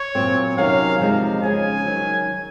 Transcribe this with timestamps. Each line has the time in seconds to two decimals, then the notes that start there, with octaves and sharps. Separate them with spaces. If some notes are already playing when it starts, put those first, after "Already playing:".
Already playing: C#5
0.15 A#2 F#3 C4
0.58 C3 D#3 F#3 C#4 F5
1.00 C3 F3 G#3 D#4
1.43 C#3 F3 G#3 C#4 G#4 G#5
1.85 D#3 F#3